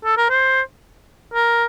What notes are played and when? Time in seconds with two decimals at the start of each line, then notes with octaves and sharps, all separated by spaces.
0.05 A4
0.17 A#4
0.30 C5
1.34 A#4